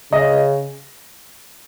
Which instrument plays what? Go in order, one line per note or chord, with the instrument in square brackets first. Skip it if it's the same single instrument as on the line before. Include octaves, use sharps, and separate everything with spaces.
[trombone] C#3 [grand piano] D#5